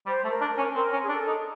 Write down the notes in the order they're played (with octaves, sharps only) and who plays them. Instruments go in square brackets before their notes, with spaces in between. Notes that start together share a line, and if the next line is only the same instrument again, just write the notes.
[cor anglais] G3 [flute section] C5
[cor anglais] A3
[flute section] A#4
[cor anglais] D4
[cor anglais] C#4 [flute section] A#4
[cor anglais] C4 [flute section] A#4
[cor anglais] C#4
[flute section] G#4
[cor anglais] D4 [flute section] A4
[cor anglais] D#4